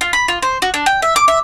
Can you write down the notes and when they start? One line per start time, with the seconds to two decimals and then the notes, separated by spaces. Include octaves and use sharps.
0.01 F4
0.13 B5
0.28 F4
0.42 C5
0.62 F#4
0.74 D4
0.86 G5
1.02 E5
1.16 D6
1.28 E5